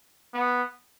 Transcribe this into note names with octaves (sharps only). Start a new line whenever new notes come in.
B3